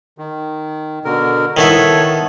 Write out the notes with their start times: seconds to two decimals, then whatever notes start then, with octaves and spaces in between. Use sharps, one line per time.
0.18 D#3
1.05 B2 D3 A#4
1.57 D#3 B3 E4 A4 C#5